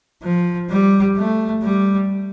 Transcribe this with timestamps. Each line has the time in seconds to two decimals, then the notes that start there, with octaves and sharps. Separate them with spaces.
0.23 F3
0.70 G3
1.17 A3
1.63 G3